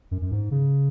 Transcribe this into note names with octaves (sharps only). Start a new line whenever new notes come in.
F#2
F#2
G#2
C#3